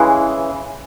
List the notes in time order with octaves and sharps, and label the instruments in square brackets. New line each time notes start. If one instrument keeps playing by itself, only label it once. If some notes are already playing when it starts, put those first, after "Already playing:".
Already playing: [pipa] C#3 E3 G#3